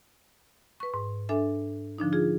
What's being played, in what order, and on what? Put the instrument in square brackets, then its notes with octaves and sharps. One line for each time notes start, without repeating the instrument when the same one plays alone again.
[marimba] B4 C#6
G#2
D4 A4 E5 G#5
D3 F3 D4 D#4
F4 G#4